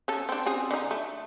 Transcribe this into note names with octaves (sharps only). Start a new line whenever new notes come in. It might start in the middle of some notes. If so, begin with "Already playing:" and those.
C#4 A4
C4 D4
C4 C#4 G#4
D3 D#4
A3